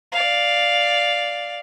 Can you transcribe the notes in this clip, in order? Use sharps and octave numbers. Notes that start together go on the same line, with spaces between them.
D5 F5